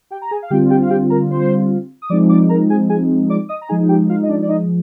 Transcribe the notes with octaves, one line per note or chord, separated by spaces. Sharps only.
G4 G5
A#5
G#4 G#5
F5
D3 G3 C4 F4 G4 G5
G4 G5
F5
G4 G5
A#4 A#5
C5 C6
D#6
F3 G#3 C4 D#4 D5 D6
D5 D6
A#4 A#5
G#4 G#5
G#4 G#5
D5 D6
D#5 D#6
A#5
F3 G#3 D#4 G#4 G#5
G4 G5
F4 F5
D#5
D4 D5
D5
D#4 D#5